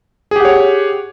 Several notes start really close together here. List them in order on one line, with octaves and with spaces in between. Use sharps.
G#4 G4 F#5 C#5